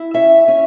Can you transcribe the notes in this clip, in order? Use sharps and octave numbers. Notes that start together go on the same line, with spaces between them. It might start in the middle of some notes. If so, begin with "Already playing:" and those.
Already playing: E4
C#4 E5
C#4